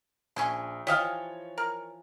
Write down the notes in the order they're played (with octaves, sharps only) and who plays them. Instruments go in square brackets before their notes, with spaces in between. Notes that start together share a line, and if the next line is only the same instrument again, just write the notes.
[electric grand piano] A#1 [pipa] C#4 G#5 C6
[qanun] E3 F3 [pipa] G4 D#5 F5 [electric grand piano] C#5
[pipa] A#4